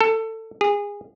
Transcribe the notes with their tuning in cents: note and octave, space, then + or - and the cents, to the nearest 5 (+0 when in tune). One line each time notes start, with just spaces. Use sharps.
A4 +20
G#4 -25